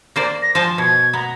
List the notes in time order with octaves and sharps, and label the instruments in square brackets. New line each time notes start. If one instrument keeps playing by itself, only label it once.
[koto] A#3 C5 D5
[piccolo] A#6
[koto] F3 G#5 A5 [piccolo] C6
[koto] B2 [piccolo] G#6
[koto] B3 [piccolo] A#5